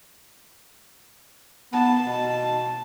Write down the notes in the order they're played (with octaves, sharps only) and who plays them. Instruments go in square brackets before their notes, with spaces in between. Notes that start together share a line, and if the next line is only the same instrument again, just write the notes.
[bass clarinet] B3 [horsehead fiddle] A5
[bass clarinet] B2